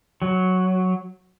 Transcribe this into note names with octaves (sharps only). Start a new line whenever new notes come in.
F#3